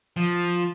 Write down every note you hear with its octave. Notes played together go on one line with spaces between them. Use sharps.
F3